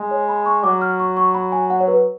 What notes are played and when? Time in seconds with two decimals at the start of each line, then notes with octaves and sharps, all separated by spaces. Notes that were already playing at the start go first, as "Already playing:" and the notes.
Already playing: G#3
0.11 C#5
0.29 B5
0.46 C#6
0.64 F#3 D6
0.82 F6
1.00 C#6
1.17 C#6
1.34 B5
1.52 G#5
1.70 F#5
1.81 C#5
1.88 B4